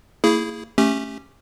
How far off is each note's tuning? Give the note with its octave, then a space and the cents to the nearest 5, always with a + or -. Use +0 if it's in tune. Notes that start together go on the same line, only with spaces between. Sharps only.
A#3 -30 E4 +0 G#4 +0
A3 +0 C#4 -10 G4 +0